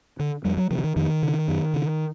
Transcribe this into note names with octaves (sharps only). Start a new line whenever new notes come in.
D3
F2 G3
F#3
C3 F3
E3
D#3
F2 D#3
C#3
F#2
C#3